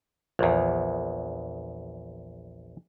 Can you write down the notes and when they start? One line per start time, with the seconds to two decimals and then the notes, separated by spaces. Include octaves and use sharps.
0.39 A#1 E2